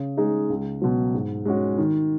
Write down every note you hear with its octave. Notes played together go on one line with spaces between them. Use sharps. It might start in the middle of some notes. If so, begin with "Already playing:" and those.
Already playing: C#3
G#3 D#4 G#4
C#2
B2 F#3
G#2
G#3 C#4 F#4
D#3